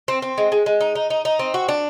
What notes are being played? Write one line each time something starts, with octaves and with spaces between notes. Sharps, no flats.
C4
C4
G#3
G#3
G#3
D#4
D#4
D#4
D#4
C4
F#4
D4